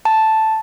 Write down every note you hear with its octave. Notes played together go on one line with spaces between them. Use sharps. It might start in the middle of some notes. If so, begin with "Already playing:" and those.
A5